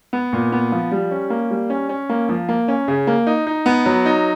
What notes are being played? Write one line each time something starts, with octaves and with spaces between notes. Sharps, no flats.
B3
A#2
B3
F3
G3
C#4
A#3
G3
C#4
C#4
A#3
F3
A#3
C#4
C#3
A#3
D#4
D#4
B3
F#3
D#4